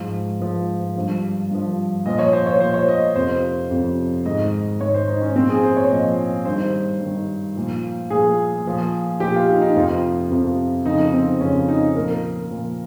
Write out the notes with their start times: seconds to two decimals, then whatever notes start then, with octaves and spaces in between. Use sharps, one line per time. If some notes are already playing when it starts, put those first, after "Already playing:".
Already playing: G#2 F3
0.40 G#2 F3
0.96 G2 F3
1.51 G2 F3
2.06 A#2 F3 D#5
2.19 C#5
2.33 C5
2.47 C#5
2.60 A#2 F3 C5
2.74 C#5
2.88 D#5
3.16 F2 C3 F3 C5
3.71 F2 C3 F3
4.26 G#2 D#3 D#5
4.80 G#2 D#3 C#5
4.94 C5
5.08 D#4
5.22 C#4
5.35 A#2 F3 C4
5.50 G#4
5.63 C5
5.77 C#5
5.90 A#2 F3 D#5
6.45 G2 D#3 C5
7.01 G2 D#3
7.56 A#2 F3
8.10 A#2 F3 G#4
8.66 A#2 F3
9.20 A#2 F3 G4
9.34 F4
9.49 D#4
9.62 D#4
9.76 F2 C3 F3 F4
10.31 F2 C3 F3
10.85 F2 C#3 F3 D#4
11.14 C4
11.41 F2 C#3 F3 C#4
11.68 D#4
11.95 A#2 F3 A#4
12.51 A#2 F3